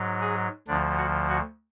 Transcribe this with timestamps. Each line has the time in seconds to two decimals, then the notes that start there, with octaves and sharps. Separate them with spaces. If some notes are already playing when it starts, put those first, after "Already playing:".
Already playing: G#2 F#3
0.21 G#4
0.68 D2 D3 F3 D4
0.97 F#4
1.29 F#4